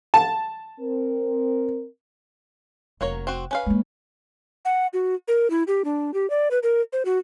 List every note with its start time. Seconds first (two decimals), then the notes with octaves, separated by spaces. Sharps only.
0.14 A5
0.79 C4 A#4
3.01 F1 F#3 A#3 C#5
3.27 C4 F#4
3.51 C#4 B4 F5
3.66 G#3 A#3
4.65 F#5
4.93 F#4
5.28 A#4
5.50 E4
5.67 G4
5.85 D4
6.14 G4
6.30 D5
6.51 B4
6.63 A#4
6.93 C5
7.05 F#4